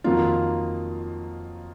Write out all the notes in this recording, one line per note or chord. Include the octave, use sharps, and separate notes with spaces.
F2 D#3 F#3 A#3 F4